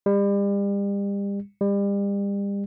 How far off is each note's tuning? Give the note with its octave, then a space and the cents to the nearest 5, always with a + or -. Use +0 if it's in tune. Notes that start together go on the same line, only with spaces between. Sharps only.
G3 +35
G3 +35